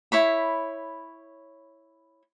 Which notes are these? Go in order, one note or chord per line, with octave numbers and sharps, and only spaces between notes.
E4 C#5 B5